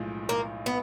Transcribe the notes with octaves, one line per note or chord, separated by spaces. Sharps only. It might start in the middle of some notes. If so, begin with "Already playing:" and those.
Already playing: B1 A2 F3 G#3
A#3
B3